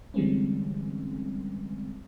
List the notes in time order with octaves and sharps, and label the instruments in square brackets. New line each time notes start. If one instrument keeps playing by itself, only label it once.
[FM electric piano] D3 E3 G3 G#3 C4 C#4